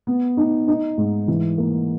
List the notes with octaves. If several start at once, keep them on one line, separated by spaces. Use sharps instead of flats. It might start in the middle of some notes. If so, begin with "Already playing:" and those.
B3
D#4
D#4
G#2
E3
A#3